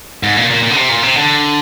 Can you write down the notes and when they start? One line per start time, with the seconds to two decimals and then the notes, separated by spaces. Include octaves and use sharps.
0.23 G#2
0.36 A#2
0.50 A#2
0.63 A#2
0.71 D3
0.76 C3
0.89 A#2
1.03 C3
1.17 D3